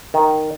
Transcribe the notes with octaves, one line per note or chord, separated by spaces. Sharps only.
D#3